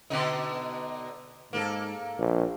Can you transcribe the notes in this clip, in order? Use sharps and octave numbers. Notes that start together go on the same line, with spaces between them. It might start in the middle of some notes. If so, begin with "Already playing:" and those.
B2 D3 D#4
G#2 A#3 A4
A#1